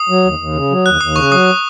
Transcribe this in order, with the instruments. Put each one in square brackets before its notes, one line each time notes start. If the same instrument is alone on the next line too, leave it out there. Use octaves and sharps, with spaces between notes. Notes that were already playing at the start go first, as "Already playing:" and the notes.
Already playing: [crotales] D#6
[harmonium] F#3
D#2
D#2
C#3
F#3
[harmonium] D#2 [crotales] F#6
[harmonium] D#2 [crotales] D#6
[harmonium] C#3 [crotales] C#6
[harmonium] F#3 [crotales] D#6